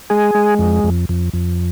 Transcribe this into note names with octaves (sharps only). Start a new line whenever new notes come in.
G#3 G#4
G#3
F2
F2
F2
F2